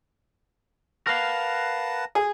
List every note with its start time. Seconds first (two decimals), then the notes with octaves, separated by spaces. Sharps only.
1.07 A#4 B4 F5 F#5 A5
2.15 G#4